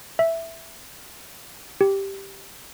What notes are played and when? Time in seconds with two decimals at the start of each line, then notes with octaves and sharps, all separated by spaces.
0.19 E5
1.81 G4